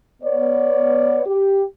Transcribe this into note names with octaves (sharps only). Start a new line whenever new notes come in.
B3 C#5 D5
G4